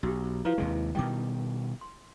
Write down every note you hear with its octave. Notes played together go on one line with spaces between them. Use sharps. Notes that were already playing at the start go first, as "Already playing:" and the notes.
B1 F#4 G4
F3 E4 B4 F5
D#2 C3 G#3
B2 D#3 G3 G5 D6
C6